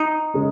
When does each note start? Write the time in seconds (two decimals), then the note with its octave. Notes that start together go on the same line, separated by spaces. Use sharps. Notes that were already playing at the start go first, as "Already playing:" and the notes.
Already playing: D#4
0.34 C#3 G#3 C#4 G#4